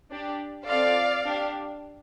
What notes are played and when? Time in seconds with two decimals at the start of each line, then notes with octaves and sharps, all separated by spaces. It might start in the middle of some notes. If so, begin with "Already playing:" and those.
0.12 D4 G4
0.67 C4 F4 A4 D5 F5
1.25 D4 G4